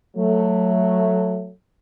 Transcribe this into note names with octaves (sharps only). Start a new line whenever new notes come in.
F#3 A3